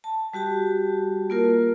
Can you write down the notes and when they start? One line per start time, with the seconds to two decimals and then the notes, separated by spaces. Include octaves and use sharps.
0.04 A5
0.34 G3 F#4 G4 A5
1.30 A#3 F4 A#4